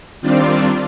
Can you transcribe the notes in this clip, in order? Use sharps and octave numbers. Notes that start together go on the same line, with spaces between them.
D#3 G3 C4 D4 F4 D5